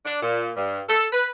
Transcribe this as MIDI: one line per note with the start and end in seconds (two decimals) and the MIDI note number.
0.05 0.18 62
0.21 0.51 46
0.57 0.81 43
0.89 1.07 69
1.13 1.30 71